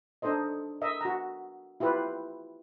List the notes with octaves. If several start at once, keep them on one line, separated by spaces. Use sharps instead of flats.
D4 D#4 A4 C5 D#5
A#4 D#5 E5
F#4 A#5
E4 F4 G4 B4